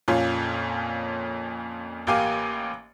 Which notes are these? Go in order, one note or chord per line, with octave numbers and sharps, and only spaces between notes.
F2 A#2 C#4 F4
A1 A#3 G4 F5 G#5 D6